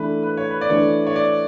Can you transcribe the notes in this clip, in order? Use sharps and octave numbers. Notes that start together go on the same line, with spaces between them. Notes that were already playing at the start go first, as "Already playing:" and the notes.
Already playing: E3 A3 D4 B4
B4
C#5
B4
D5
E3 A3 D4 C#5
C#5
D5